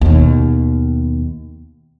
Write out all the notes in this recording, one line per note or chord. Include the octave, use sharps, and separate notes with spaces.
D#2 B2